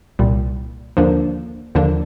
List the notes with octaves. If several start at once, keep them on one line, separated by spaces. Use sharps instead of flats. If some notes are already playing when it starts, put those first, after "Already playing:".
C2 A#2 G3
D#2 D3 F3 A#3 D4
D#2 D3 F3 A#3 D4